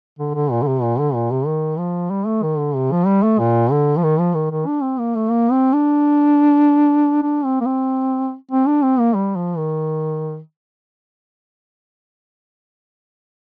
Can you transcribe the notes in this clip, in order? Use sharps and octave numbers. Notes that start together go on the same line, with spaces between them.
D3
D3
A#2
D3
C3
A#2
D3
A#2
C3
D#3
F3
G3
A3
D#3
D3
C3
F3
G3
A3
A#2
D3
F3
D#3
F3
D#3
D#3
D4
C4
A#3
A3
A#3
C4
D4
D4
C4
A#3
C4
C4
D4
C4
A#3
G3
F3
D#3